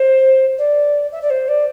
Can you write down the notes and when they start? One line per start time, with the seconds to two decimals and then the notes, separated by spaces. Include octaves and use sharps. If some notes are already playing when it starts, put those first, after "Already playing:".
Already playing: C5
0.58 D5
1.12 E5
1.21 D5
1.30 C5
1.48 D5